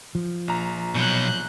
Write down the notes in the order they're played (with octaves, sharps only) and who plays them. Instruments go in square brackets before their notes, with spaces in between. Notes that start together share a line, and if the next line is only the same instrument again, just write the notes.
[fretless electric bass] F3
[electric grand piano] A#1 A#5
[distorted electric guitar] B2 F#3 [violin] F#6 G6